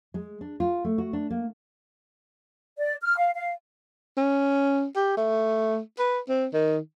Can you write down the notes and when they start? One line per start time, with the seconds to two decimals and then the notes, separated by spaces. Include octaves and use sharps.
0.14 G#3
0.41 D4
0.60 F4
0.85 A3
0.98 F#4
1.13 D4
1.30 A#3
2.78 D5
3.02 F6
3.18 F5
3.34 F5
4.17 C#4
4.96 G4
5.17 A3
5.99 B4
6.29 C4
6.53 D#3